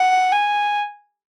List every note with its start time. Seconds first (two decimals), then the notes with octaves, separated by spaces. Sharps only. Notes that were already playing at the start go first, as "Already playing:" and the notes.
Already playing: F#5
0.32 G#5